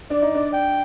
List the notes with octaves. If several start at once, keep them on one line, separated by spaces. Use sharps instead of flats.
D4 D5
D#4
D4
G5